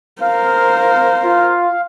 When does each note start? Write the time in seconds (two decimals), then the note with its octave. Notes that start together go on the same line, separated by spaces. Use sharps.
0.22 A#4 C5 F5
1.24 F4